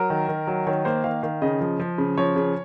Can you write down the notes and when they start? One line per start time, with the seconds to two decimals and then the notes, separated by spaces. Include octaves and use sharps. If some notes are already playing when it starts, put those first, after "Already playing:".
Already playing: F#3 A#4
0.10 D#3
0.29 D#3
0.47 F#3
0.67 D#3 C#5
0.85 A#3 C5
1.04 D#3 F5
1.23 D#3 F5
1.42 C#3 D#5
1.61 F3
1.80 F3
1.98 C#3
2.18 F3 C#5
2.36 C#3